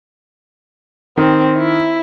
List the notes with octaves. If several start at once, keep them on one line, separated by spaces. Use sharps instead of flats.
D#3 C4
E4